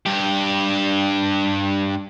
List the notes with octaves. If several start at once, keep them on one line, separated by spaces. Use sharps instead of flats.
G2 G4